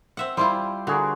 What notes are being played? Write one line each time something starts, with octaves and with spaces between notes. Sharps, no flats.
C4 E5 F#5
G3 E4 F4 C5 D5 C6
D3 F#4 G#4 A#4